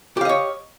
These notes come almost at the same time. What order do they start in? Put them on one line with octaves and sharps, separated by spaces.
G4 F5 D#5 C#5